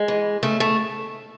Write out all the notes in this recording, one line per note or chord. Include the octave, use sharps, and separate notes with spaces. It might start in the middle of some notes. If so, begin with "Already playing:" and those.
Already playing: G#3
E3
C#3 A3
A3